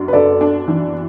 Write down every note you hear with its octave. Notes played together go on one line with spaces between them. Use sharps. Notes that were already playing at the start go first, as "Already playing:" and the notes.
Already playing: F#2 D4
B4
D4 A4 D5
D4
E3